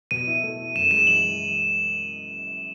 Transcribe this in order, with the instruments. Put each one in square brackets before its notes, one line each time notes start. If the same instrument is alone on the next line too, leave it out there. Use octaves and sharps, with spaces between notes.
[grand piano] B2 [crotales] D#7
[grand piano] E4
A3
E4
[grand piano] F#2 [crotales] E7
[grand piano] G#3 [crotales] E7
[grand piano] E3 [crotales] F#7
[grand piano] E3